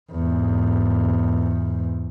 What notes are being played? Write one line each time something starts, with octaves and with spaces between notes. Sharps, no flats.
E2 G#2